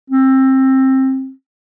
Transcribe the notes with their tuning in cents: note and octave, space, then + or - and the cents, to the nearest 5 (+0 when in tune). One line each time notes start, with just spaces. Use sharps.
C4 +20